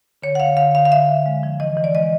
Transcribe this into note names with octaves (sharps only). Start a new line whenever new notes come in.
D3 C#5
F#5
D3 F5
D3 F5
D3 F5
F5
D3 E5
D3
G#3
F3
E3 D#5
E3
D5
G#3 D#5